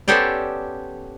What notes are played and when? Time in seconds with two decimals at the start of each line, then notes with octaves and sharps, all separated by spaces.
0.08 B3 C#4 G4 A4 C5 D5